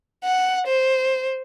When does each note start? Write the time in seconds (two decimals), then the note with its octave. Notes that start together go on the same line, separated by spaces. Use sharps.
0.24 F#5
0.67 C5